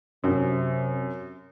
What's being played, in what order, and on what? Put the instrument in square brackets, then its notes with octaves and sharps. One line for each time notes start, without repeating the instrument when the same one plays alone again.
[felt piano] F#2 [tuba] C3